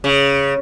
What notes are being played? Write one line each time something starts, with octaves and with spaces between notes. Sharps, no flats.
C#3